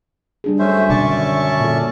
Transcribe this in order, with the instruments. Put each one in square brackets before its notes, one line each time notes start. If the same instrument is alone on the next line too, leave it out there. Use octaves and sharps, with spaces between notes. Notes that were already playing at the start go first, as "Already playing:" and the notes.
[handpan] G3 D4 G#4
[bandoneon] F#2 C#4 E5 [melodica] A3 C5
[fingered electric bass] B2 D3 D#3 [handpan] D4 [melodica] D5 A5 C#6
[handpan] A#2 A4